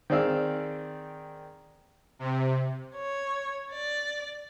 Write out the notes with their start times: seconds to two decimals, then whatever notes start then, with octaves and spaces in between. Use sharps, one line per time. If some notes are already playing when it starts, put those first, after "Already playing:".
0.10 D#3 C4 G#4 D5 F5 E6
2.19 C3
2.94 C#5
3.71 D5